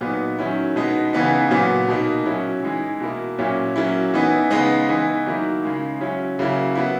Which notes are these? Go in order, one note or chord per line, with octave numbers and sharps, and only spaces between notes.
A#2 F#3 B3 D#4
D#3 F#3 C#4 E4
B2 G#3 B3 D#4
C#3 E3 B3 D#4
A#2 F#3 B3
B2 A#3 D#4
F#3 C#4 E4
E3 G#3 D#4
B2 A#3 E4
A#2 F#3 C#4 E4
F#3 A#3 C#4 E4
E3 B3 D#4
C#3 G#3 B3 D#4
E3 B3 D#4
D#3 F#3 A#3 E4
C#3 G#3 D#4
F#3 C#4 E4
C#3 F#3 A#3 E4
F#3 B3 E4